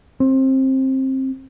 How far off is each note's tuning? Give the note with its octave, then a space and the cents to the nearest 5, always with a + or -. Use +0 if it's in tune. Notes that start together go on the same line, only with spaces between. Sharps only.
C4 +20